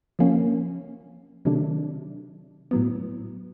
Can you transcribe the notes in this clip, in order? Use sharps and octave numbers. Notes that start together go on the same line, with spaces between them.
F3 A#3 C#4
C3 D#3 F#3 A3 D4
A2 F#3 B3